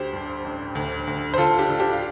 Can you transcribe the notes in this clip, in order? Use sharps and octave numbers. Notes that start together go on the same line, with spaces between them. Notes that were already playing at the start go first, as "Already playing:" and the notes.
Already playing: D2 G4 C5
G2
A1
D2
D2
C5
D2 F4 A4
D4 G4
D2 A4
D4 G4
F5